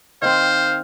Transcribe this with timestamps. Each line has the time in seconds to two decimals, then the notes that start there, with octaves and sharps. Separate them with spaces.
0.22 D#3 C4 C5 F5